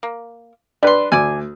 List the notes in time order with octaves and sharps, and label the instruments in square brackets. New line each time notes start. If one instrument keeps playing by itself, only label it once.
[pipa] A#3
[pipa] G3 C6 [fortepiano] D4 B4
[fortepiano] D2 [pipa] D5 G#5